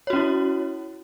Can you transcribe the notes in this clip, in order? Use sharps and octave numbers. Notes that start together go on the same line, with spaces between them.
C#4 E4 F#4 C#5